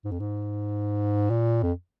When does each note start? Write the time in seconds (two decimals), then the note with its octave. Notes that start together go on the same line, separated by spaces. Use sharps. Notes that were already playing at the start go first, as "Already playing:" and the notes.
0.04 G#2
0.11 F2
0.20 G#2
1.30 A#2
1.63 F2